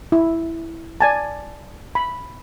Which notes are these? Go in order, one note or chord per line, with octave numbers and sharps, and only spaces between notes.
E4
D5 G#5 A5
B5